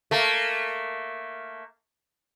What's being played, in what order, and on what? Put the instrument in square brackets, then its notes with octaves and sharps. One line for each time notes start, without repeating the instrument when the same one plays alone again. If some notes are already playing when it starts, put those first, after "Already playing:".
[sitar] A3 A#3